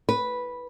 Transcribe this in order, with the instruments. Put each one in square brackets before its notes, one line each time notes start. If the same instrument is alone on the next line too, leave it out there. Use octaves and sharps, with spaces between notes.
[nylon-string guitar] B4